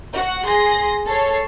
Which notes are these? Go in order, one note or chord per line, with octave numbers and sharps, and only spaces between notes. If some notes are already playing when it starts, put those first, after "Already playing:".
F#4 F#5
G#4 C6 A#6 C7
A4 C#5 C7